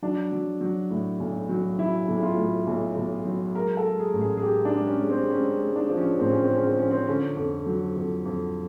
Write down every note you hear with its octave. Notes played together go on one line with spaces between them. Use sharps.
F#3 D4
F#3
F#3
A2
B1
F#3
F#3 E4
B1
E4
F4
A2
B1
B1
F#3
G#3 A#4
A4
G#3
G#4
A1
G#4
G#4
G#3 G4
D4
G#3
C#4
G#3
C4
G#3 C#4
G#3
D4
F3
C#4
A1 C4
C#4
C4
G#3
C#4
C4
F3 C#4
C4
D3 C#4
F2
F#3
F2
F2